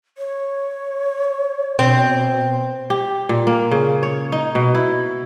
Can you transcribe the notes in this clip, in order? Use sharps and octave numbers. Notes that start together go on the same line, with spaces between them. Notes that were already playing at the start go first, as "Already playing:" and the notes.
C#5
B2 C4
G4
A#2
A#3
C#3
C#5
D#4
B2
E4